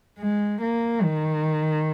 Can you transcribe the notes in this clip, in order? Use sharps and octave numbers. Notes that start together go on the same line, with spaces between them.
G#3
A#3
D#3